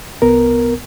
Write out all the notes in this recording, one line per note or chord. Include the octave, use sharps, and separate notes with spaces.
C2 B3 A#4